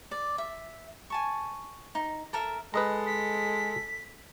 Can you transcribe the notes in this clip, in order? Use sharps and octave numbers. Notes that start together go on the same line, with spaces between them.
D5
E5
G#5 A5 C#6
D#4
A4 A#4 E5 A#5
G#3 A4 B4 D#5 A#5
B6